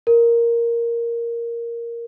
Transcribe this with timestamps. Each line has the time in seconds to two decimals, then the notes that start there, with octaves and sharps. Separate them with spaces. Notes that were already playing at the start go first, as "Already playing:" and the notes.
0.07 A#4